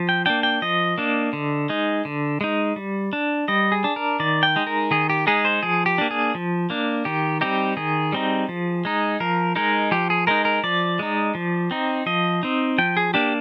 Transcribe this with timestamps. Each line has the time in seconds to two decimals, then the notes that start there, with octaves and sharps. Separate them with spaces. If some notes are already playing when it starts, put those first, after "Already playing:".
Already playing: F3
0.09 G5
0.26 A#3 D4 G5
0.43 G5
0.62 F3 D#5
0.98 A#3 D4
1.33 D3
1.69 G#3 D#4
2.05 D3
2.41 G#3 D#4
2.76 G3
3.13 D4
3.48 G3 D#5
3.72 G#4
3.84 D4
3.96 A#4
4.20 D#3 D5
4.43 G5
4.56 G#3 D#4
4.67 A#4
4.91 D#3 G#4
5.10 G4
5.27 G#3 D#4 G#4
5.45 C5
5.63 F3 G#4
5.86 G4
5.98 A#3 D4
6.11 G#4
6.35 F3
6.70 A#3 D4
7.05 D#3 G4
7.41 G3 C4 D#4 G4
7.77 D#3 G#4
8.12 G3 C4 D#4
8.49 F3
8.85 G#3 D#4
9.20 F3 A#4
9.56 G#3 D#4 A#4
9.91 F3 G4
10.10 G#4
10.27 G#3 D#4 A#4
10.45 A#4
10.64 F3 D5
10.99 G#3 D#4
11.35 F3
11.71 C4 D#4
12.06 F3 D#5
12.43 C4 D#4
12.78 F3 G5
12.97 G#4
13.14 A#3 D4 G4